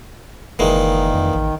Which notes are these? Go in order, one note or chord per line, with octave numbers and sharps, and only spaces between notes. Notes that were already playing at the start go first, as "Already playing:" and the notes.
F#1 A#2 D#3 E3 G#3
F2
A1